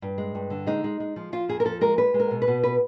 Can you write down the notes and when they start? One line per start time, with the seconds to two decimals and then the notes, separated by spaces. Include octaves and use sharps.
0.02 G2
0.18 G#3
0.35 G2
0.50 D3
0.67 G#3 D#4
0.84 G#3
1.00 G#3
1.16 F3
1.32 F3 F4
1.49 F2 G#4
1.60 A#4
1.65 F3 A4
1.81 G#3 A#4
1.98 G#3 B4
2.14 G#3
2.20 A#4
2.31 B2
2.42 B4
2.48 B2
2.64 B4